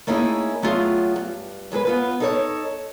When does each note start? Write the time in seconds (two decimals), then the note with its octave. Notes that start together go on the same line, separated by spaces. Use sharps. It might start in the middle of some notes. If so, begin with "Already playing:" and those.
0.07 A3 A#3 C#4 D#4 E4 G#4
0.62 F#3 A3 B3 F4 G#4
1.16 G2
1.72 F#2 G#3 G#4 B4
1.85 B3 F4 B4
2.20 D#4 A4 C#5